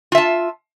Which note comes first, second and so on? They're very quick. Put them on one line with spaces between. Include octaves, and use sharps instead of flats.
F4 E5 A5